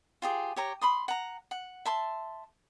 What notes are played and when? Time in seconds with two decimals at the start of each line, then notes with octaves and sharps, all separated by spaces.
0.22 F4 G4 G#4
0.56 G4 C#5 A#5
0.81 B5 C6 D#6
1.08 F#5 A#5
1.51 F#5
1.86 E5 A5 C6